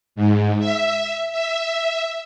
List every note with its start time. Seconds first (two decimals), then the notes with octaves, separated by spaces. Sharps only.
0.16 G#2
0.59 E5
1.32 E5